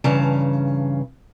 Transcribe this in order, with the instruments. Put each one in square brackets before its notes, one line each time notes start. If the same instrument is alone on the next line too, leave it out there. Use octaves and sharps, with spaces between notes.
[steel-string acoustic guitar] G2 C#3 E3 A5 A#5